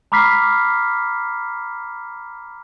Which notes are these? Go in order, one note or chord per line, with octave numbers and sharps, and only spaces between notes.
A#5 B5 D6 F6 B6 C7